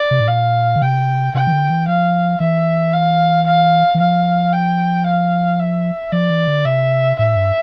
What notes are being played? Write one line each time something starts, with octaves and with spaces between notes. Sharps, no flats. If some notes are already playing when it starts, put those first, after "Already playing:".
Already playing: D5
C3
A2
A#2 F5
D3
C3 G5
C3 G5
E3
D3
E3
F3 F5
E3 E5
F5
F5
E3
F3 F5
G5
F5
E5
F3 D5
E3
D3
C3 E5
A2 E5
G2